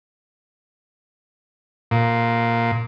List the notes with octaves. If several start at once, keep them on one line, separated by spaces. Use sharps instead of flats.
A#2